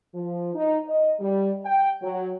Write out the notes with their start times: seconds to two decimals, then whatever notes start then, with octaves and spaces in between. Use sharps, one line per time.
0.15 F3
0.55 D#4
0.88 D#5
1.20 G3
1.65 G5
2.02 F#3